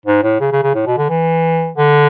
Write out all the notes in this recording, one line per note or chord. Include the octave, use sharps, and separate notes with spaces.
G#2
A2
C#3
C#3
C#3
A2
B2
D3
E3
D3